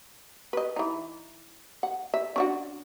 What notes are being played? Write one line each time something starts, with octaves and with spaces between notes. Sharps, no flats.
B4 D#5
E3 D#4
F#5
E5
C#4 D4 F#4